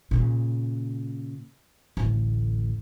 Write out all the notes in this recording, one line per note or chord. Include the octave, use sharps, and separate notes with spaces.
A#2 C#3
A1 D2